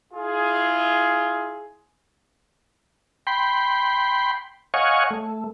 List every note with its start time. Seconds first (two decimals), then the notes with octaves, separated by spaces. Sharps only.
0.13 E4 F4 G#4
3.27 G5 B5 C6
4.74 C#5 D#5 F5 F#5 G#5 C#6
5.11 A3